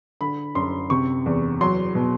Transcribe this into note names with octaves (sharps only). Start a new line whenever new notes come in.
D3 B5
F#2 C6
C3 C#6
E2
F#3 C6
B2